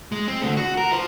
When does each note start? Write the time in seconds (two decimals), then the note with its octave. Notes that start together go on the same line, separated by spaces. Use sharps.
0.12 G#3
0.28 C4
0.42 D3 A3
0.57 F#4
0.77 A#4
0.91 F4 C5